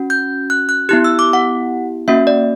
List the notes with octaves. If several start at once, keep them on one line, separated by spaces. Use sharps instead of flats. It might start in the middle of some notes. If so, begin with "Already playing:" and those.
Already playing: C#4 F#4
G6
F#6
F#6
B3 E4 G4 F#6
E6
D6
F#5
A#3 C#4 F#4 E5
D5